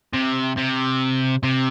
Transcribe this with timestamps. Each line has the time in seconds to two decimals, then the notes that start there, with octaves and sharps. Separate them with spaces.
0.13 C3
0.57 C3
1.43 C3